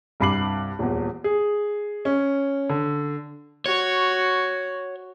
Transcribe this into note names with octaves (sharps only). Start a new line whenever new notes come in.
C2 G2 B5 D6 C7 F#7
D#1 E2
G#4
C#4
D3
F#4 C#5